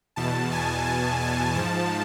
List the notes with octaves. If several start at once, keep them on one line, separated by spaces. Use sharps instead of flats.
E2 B2 A5
G#5
G#5
G#5
G#2 F3 A5